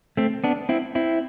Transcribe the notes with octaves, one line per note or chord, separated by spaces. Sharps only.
A3 C4
B3 D4
C4 E4
C4 E4